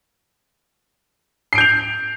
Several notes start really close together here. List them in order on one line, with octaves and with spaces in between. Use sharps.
C7 D7 G6 F7